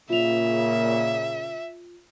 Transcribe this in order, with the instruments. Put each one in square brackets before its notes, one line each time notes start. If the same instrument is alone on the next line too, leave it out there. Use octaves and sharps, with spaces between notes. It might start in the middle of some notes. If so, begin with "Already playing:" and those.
[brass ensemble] A#2 C#3 [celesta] F4 F7 [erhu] E5